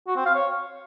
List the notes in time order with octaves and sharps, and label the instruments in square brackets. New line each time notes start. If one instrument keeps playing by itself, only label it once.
[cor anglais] F#4
C4
F5
C#5